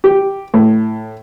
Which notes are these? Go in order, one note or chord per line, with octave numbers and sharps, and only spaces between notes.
G4
A2